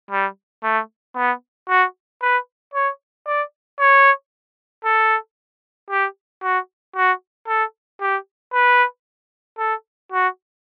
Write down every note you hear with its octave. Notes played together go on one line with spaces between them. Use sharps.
G3
A3
B3
F#4
B4
C#5
D5
C#5
A4
G4
F#4
F#4
A4
G4
B4
A4
F#4